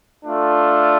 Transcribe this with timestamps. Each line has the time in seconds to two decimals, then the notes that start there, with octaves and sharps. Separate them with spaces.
0.24 A3 D4 F4